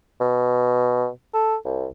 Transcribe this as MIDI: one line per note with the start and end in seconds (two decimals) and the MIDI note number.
0.21 1.09 47
1.34 1.56 69
1.65 1.87 36